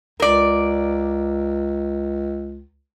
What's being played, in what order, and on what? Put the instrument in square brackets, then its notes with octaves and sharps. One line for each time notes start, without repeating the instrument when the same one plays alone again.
[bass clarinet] C#2 [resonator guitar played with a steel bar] A#4 D5